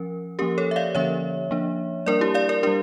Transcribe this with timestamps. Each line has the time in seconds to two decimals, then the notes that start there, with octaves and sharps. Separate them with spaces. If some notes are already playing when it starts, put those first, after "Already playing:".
Already playing: F3 C#4 A#4
0.39 F3 A#3 C#4 G4 A#4
0.58 A4 C#5
0.71 E5
0.76 D5 F5
0.95 D3 F3 A#3 C#4 C#5 E5
1.51 F3 A#3 D4
2.06 G3 A#3 D4 A#4 D5
2.21 E4 G4
2.34 D5 F5
2.49 A#4 D5
2.63 G3 D4 G4 A#4